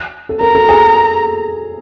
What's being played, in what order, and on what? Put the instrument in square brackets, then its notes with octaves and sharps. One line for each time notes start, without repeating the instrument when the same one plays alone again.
[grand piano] A4
[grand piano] A#4 [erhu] A#5
[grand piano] A4
G#4